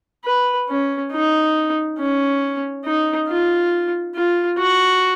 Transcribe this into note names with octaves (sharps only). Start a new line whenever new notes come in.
B4
C#4
D#4
C#4
D#4
F4
F4
F#4